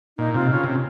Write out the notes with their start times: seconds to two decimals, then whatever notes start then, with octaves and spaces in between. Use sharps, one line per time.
0.18 A#2 D#4
0.34 C3 F4
0.52 C#3 F4
0.64 C3